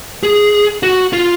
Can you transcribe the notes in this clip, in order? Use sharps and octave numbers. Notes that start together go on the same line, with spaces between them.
G#4
F#4
F4